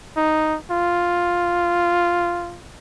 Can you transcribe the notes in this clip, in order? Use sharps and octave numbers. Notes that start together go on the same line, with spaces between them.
D#4
F4